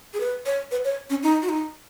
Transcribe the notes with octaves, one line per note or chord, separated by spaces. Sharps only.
G#4
B4
C#5
B4
C#5
C#4
D#4
F#4
D#4